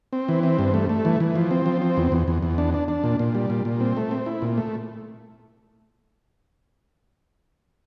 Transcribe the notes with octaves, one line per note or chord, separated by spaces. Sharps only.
C4
E3
C4
G2
A3
A3
E3
E3
F3
C4
F3
C4
E2
E2
E2
E2
D4
D4
D4
A#2
A#2
G3
A#2
A#2
C4
A3
C4
E4
A#2
A3